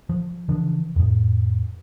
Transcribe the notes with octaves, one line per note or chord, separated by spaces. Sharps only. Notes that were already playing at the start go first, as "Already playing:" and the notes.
F3
C#3 E3 F3 D4
F2 A2